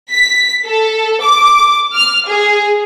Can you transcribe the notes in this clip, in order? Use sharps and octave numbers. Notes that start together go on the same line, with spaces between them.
B6
A4
D6
F6
G#4